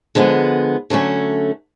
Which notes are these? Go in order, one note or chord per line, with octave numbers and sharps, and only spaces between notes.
D3 F3 G#3 B3
D3 F#3 A3 C#4